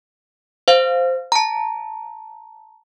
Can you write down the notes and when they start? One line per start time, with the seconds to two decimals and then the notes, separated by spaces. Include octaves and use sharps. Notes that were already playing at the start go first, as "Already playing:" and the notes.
0.68 C5 F5
1.32 A5 A#5